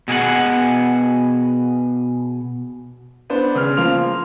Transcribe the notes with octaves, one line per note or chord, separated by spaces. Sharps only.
B2 G#4 A#4 F#5
B3 D4 C5
C#3 F6
F3 A#3 C6 F7